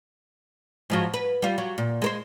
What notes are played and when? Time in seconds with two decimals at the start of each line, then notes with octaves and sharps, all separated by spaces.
0.90 G#2 F3 F#3
1.14 B4
1.42 G3 F4
1.58 F#3
1.78 A#2
2.02 G#3 A#4 C5